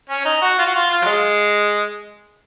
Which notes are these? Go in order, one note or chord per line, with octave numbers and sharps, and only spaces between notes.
C#4
D#4
F#4
F4
F#4
F4
F4
F#3
G#3